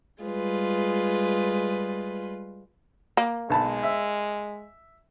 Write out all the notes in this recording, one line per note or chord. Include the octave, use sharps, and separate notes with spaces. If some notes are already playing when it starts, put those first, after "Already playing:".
G3 G#3 F4 B4
A#3
B1 G#3 A5 B5
E5